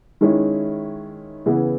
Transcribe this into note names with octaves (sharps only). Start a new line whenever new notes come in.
D#3 G#3 C#4 E4
C#3 E3 B3 E4